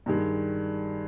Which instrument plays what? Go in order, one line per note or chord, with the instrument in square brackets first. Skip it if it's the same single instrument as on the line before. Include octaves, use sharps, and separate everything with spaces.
[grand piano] G2 D#3 G#3